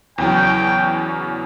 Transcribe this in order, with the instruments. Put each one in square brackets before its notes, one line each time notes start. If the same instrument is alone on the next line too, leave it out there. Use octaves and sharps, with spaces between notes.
[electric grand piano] E2 C#3 F#3 [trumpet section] G5